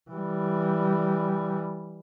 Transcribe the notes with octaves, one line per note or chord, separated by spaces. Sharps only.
E3 G3